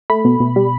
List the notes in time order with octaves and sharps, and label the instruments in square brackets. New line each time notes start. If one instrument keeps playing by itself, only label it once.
[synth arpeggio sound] A3 B5
B2
B2
G3